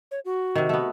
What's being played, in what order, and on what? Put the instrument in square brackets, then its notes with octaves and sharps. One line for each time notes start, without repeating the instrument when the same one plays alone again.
[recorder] C#5
F#4
[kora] C3 D#3
A3 B3